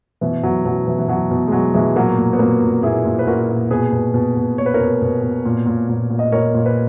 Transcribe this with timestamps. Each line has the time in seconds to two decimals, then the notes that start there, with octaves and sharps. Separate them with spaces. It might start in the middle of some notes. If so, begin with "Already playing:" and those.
0.21 B2 E3
0.43 B2 F#3
0.65 B2 F#3
0.87 B2 E3
0.98 E3
1.08 B2 F#3
1.31 B2
1.48 G#3
1.52 B2 F#3
1.74 B2 E3 G#3
1.96 A#2 F#3 A#3
2.18 A#2
2.33 B3
2.39 A#2 F#3 A#3
2.62 A#2
2.83 A#2 E4 G#4
3.05 A#2
3.19 B4
3.27 A#2 F#4 A#4
3.49 A#2
3.71 B2 G#4 B4
3.92 B2
4.14 B2
4.36 B2
4.58 B2 C#5
4.66 B4
4.74 A#4 C#5
4.80 B2
5.02 B2
5.23 B2
5.45 A#2
5.66 A#2
5.89 A#2
6.10 A#2
6.19 D#5
6.32 A#2 A#4 C#5
6.54 A#2
6.66 B4